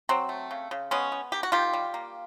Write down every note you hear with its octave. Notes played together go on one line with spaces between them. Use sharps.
F#3 C4
A3
C#3
C#3
G#3 B3 C#4
B3
D#3 G4
F#4
D#3 F4 G4
G3
A#3